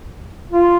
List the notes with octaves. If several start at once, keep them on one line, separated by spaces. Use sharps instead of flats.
F4